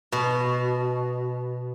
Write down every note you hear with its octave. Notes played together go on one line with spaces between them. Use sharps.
B2